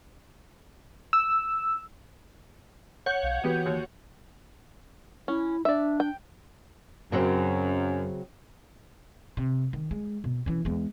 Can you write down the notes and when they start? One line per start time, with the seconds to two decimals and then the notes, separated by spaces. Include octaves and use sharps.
1.13 E6
3.06 C#5 F#5 G6
3.23 B1 F5
3.44 E3 B3 F#4 G4 B4
3.66 D#2
5.28 C#4 E4
5.65 D4 D5 E5
6.00 G5
7.12 F#2 C#3 F#3 C4
9.37 C3
9.73 D#3
9.91 G#3
10.24 B2
10.46 E3 C#4
10.65 E2 G#3